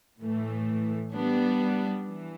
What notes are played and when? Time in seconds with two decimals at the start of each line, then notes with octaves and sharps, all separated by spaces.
0.20 A2 E3 A3
1.14 G3 B3 D4
2.07 E3